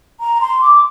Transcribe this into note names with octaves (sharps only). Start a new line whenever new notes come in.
A#5
C6
D6